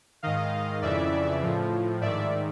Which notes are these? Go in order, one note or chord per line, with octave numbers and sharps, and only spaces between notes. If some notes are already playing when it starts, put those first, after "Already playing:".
G#2 D#3 D#5 F5
F2 C#3 E3 D5 E5
A2 F3
G#2 D#3 D5 E5